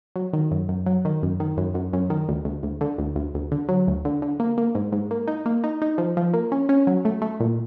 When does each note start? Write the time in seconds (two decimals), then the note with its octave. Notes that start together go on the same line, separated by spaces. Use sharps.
0.16 F#3
0.33 D#3
0.51 F#2
0.69 F#2
0.86 F#3
1.05 D#3
1.23 F#2
1.40 D#3
1.57 F#2
1.74 F#2
1.93 F#2
2.10 D#3
2.29 D2
2.45 D2
2.63 D2
2.81 D3
2.98 D2
3.16 D2
3.34 D2
3.52 D3
3.69 F#3
3.87 D2
4.05 D3
4.22 D3
4.40 A#3
4.58 A#3
4.75 G#2
4.92 G#2
5.11 A#3
5.27 D#4
5.46 A#3
5.64 D#4
5.82 D#4
5.98 F3
6.17 F3
6.33 A#3
6.52 C#4
6.69 C#4
6.87 F#3
7.05 A3
7.22 A3
7.40 A#2